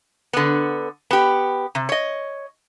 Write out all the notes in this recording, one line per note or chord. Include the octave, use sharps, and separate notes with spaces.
D3 B3
B3 G4
C3
C#5 D#5